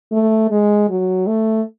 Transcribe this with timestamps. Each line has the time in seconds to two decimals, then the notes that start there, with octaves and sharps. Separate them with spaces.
0.12 A3
0.51 G#3
0.90 F#3
1.27 A3